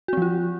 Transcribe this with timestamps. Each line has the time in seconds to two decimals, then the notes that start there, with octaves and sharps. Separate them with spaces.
0.08 F#4
0.13 C4
0.17 F3
0.22 F4